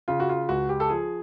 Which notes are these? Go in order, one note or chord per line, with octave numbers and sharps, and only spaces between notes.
C#3 F4
F#4
F4
C#2 F#4
G4
A4
F3 G#4